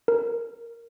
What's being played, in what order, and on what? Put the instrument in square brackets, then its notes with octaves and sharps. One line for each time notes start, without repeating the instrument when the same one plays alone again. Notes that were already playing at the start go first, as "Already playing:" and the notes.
[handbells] A#4